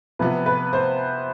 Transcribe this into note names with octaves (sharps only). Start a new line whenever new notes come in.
C3 F3 B3 B4
B4
C5